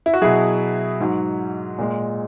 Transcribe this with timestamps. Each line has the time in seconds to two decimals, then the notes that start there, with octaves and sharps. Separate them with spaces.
0.06 E4
0.14 F#4
0.22 B2 F#3 E4 G#4
1.00 G#2 F#3
1.78 A#2 G#3